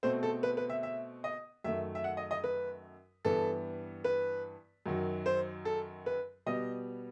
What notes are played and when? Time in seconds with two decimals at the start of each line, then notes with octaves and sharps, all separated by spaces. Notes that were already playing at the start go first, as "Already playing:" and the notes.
0.03 B2 A3 C4 C5
0.23 A4
0.43 B4
0.57 B4
0.70 E5
0.83 E5
1.24 D#5
1.64 F#2 D#3 A3 E5
1.95 E5
2.04 F#5
2.17 D#5
2.31 D#5
2.44 B4
3.25 G2 E3 B3 A4
4.04 B4
4.86 F#2 D#3 F#3
5.26 C5
5.65 A4
6.06 B4
6.46 B2 G3 B3 D#5